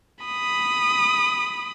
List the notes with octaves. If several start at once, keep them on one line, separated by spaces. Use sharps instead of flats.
B5 D#6